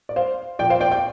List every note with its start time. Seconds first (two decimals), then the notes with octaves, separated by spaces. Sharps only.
0.09 D5
0.16 C5 F5
0.59 A#2 F3 D5 G5
0.70 C5 F5
0.80 D5 G5
0.91 D5 G5